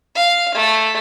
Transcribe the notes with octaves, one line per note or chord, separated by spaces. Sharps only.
F5
A3